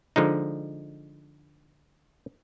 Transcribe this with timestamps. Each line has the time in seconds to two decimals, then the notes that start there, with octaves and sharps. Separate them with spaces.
0.16 D3 F3 G#3 D#4